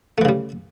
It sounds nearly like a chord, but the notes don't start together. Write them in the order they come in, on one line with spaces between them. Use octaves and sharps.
A3 E3 C#3 G3